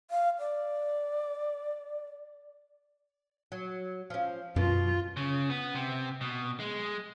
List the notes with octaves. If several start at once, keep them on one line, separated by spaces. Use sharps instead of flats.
F5
D5
F#3
F3 C#4
F#2 B2 F4
C#3
B3
C3
B2
G#3